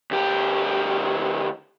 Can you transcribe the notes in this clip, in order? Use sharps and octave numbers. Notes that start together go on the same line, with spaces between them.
D2 G4